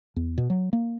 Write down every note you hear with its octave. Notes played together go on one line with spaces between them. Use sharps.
E2
B2
F#3
A#3